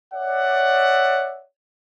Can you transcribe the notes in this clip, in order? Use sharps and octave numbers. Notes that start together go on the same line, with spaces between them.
C#5 D5 E5 F#5